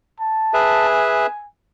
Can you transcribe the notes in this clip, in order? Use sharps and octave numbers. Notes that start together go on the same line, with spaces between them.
A5
G#4 B4 E5
G#5